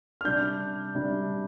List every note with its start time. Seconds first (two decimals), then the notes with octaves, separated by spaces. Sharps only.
0.21 F6
0.25 C3 G3 D4 G6
0.95 C3 G3 D4